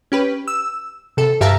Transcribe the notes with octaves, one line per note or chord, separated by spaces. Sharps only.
C#4 G4 B4
E6
C3 A4
G2 G4 E5 F5 A5 A#5